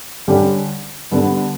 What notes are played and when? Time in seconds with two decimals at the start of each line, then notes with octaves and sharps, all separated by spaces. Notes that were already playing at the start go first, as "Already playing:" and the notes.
0.28 D3 G3 C#4 G4
1.11 D3 G3 B3